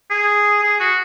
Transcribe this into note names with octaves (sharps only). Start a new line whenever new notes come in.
G#4
G#4
F#4